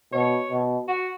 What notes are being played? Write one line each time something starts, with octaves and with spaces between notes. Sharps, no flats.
B2 C#5
B2
F#4